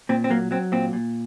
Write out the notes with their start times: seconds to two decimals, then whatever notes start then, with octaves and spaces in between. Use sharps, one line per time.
0.09 A#2 C4
0.24 C4
0.30 F#3 A#3
0.51 F#3 C4
0.72 A#2 C4
0.93 A#2